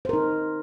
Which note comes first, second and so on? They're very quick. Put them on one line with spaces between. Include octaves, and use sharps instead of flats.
C5 A#4 D#4